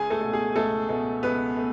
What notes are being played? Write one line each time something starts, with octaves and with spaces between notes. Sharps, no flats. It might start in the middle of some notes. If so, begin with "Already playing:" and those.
Already playing: C#2 G#4 G#5
A3 A4
B2 A3
G#4
C#2 A3 A4
B2 A3
C#2 B3 B4
A3